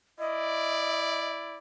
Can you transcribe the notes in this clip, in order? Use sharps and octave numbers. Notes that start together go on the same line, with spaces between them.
E4 D5 D#5